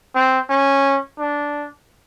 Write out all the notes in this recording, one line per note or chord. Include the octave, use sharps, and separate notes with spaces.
C4
C#4
D4